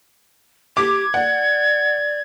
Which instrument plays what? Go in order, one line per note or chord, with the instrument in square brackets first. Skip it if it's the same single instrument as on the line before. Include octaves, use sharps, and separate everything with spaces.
[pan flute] G4 [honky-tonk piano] D6 [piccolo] G#6
[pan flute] D5 [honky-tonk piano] F#5